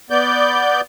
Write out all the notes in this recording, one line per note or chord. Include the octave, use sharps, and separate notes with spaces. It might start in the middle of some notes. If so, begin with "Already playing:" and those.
B3 D5 G6